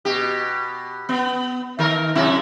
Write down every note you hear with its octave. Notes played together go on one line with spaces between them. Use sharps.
B2 G4
B3
D#3 A#4
F#2 C3 E4